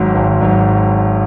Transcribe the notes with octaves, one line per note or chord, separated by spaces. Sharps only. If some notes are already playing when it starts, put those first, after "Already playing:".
Already playing: G#1 G#2 F#3
G#1
G#2 F#3